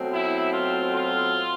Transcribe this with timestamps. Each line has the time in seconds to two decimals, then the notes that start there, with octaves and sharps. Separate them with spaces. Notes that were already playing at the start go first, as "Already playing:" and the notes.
Already playing: B2 F#3 A3 C4
0.11 E4
0.52 F4
0.95 F4